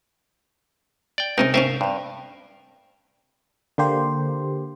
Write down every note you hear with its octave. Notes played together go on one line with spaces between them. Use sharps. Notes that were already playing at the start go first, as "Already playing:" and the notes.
D5 G5
C#2 C3 G#3 D#4 A#4
G#2 C3 C#4 A#4 E5 F5
G2
D3 A#3 G4 C5